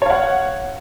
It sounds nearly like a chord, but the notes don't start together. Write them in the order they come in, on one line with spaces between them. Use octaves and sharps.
C#5 F5 F#5